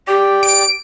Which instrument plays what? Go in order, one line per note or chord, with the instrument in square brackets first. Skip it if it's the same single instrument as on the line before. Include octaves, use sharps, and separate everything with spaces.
[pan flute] G4 [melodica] D5 G5
[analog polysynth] D7